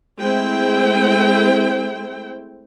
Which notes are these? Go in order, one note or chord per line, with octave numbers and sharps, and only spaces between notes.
G#3 A3 C4 E4 C5 G5